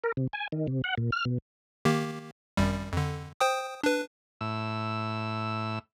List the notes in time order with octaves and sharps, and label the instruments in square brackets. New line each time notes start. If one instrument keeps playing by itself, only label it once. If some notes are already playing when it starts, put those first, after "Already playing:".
[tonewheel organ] A#4
C3
G#5
D#3
C3
F#5
A#2
F6
B2
[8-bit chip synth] D#3 A#3 G4
G#1 F#2 G3
F2 D3
C5 G5 D#6
D4 B4
[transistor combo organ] A2 E6